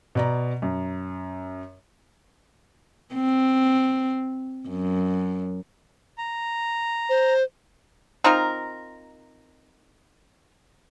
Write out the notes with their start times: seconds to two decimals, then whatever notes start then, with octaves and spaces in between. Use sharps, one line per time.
0.15 B2 D5 A#5
0.62 F#2
3.15 C4
4.69 F#2
6.18 A#5
7.09 C5
8.24 C4 D#4 F4 A#4